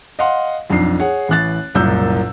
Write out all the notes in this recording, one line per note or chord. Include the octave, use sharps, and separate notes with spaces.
D#5 F5 F#5 C6
B1 F2 D4 C7
G#4 C#5 F#5
A1 E3 F#6 A6
F#1 C2 A#2 E6 G6